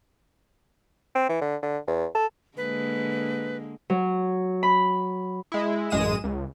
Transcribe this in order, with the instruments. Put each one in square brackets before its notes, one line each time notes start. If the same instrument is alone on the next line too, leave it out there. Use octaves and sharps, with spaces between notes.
[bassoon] C4
E3
D3
D3
E2
A4
[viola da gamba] D3 G#3 A#3 [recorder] B4
[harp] F#3
B5
[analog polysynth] G#3 E4
A1 F#2 G#3 D#6 D#7 E7
C#2